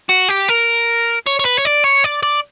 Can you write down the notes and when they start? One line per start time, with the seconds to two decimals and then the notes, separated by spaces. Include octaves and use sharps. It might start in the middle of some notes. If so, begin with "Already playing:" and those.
0.09 F#4
0.29 G4
0.49 A#4
1.26 C#5
1.39 C#5
1.45 B4
1.58 C#5
1.65 D5
1.84 C#5
2.04 D5
2.23 D5